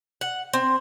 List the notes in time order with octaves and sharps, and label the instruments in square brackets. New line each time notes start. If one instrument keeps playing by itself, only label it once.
[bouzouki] F#5
C4